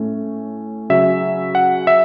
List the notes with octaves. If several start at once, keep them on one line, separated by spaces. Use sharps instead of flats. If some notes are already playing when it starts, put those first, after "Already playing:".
Already playing: A2 A3 C#4
C#3 F#3 C#4 E5
F#5
E5